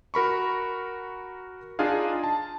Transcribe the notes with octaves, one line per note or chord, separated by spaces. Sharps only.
F#4 A#4 B5 C#6
D4 D#4 F4 G#4 F5
A5